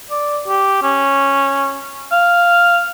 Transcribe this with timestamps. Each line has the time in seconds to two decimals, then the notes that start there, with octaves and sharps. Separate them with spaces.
0.11 D5
0.48 G4
0.83 C#4
2.12 F5